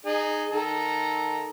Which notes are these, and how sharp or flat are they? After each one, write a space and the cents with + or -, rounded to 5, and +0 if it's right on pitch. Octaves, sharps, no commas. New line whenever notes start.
D#4 -20 G#4 +0
D#3 -5 A4 -10 A#5 +0